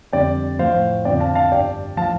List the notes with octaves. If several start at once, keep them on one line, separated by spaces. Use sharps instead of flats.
F2 D3 G3 D5 G5
A2 F3 C5 F5
F2 D3 F3 D5 G5
F5 A5
F5 A5
G2 G3 D5 G5
A2 F3 F5 A5